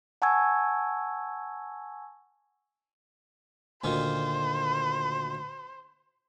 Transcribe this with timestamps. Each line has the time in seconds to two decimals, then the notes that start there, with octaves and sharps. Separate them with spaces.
0.22 F#5 G#5 A5 C#6 E6 G#6
3.84 D2 A#2 D#3 C5